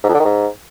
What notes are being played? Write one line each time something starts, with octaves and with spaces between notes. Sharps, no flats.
G#2
F2
D3
D#3
G#2